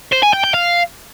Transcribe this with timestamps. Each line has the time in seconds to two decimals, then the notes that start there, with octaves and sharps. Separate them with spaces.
0.13 C5
0.23 G#5
0.33 G5
0.44 G5
0.54 F5